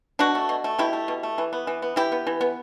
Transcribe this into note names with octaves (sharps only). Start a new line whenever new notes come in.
B2 D4 F#4
A3
B2
A3
B2 E4 G4
A3
B2
A3
E3
B3
E3
B3
E3 E4 G4
B3
E3
B3